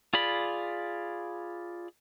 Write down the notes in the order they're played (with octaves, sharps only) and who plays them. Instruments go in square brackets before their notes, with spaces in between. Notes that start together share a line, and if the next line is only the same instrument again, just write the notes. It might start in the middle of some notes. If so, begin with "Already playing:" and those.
[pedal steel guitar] F4 G#4 D5 B5